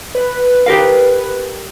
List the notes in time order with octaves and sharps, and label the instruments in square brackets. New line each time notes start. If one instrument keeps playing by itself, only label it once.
[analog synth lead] B4
[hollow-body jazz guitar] G4 A#4 F5